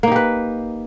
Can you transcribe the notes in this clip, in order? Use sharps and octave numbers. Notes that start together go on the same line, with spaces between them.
A#3 D#4 G4 B4